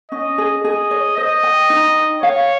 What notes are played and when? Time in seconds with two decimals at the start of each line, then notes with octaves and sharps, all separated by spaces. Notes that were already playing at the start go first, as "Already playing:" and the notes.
0.11 C#4 D#5
0.38 G#4
0.64 G#4 D#5
0.91 C#5
1.17 C5 D#5
1.43 G5
1.70 D#4
1.96 G5
2.22 C#5 F5